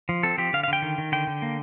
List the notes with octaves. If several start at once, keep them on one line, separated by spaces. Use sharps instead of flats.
F3
C4 A4
F3 G4
D3 F5
F5
D3 G5
D#3
D#3
D3 G5
D3
A#3